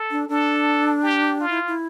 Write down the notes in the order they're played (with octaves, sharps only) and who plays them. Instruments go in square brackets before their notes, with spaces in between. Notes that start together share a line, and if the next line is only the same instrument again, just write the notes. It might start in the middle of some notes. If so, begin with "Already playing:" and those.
Already playing: [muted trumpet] A4
[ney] D4
[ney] D4 [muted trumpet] A4
[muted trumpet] G4
F4
[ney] E4
E4